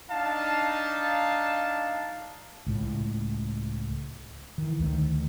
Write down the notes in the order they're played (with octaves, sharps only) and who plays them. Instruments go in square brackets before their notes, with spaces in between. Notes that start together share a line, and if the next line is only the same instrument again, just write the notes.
[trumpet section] D4 D#4 F5 A5
[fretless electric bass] C#2 A2
D#3 E3
D2 D#3 A3